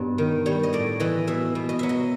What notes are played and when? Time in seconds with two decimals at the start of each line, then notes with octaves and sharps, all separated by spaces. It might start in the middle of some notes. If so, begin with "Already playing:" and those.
Already playing: G2 B2 F#3
0.18 D#3
0.46 G3 C#5
0.63 D#5
0.73 A2 D5
1.00 E3 D#5
1.27 B2 E5
1.55 B2
1.69 D#5
1.79 F#3 E5
1.89 D#5